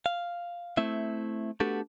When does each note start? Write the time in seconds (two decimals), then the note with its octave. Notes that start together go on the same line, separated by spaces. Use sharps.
0.06 F5
0.77 A3 C4 E4 E5
1.60 A3 B3 D4 F#4 G4 A4